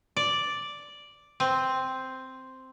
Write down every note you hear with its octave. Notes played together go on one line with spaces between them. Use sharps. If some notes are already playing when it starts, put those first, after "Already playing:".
D5
C4